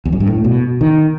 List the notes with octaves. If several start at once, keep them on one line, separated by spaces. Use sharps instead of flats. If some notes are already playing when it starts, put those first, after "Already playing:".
E2
F#2
G2
A2
B2
D#3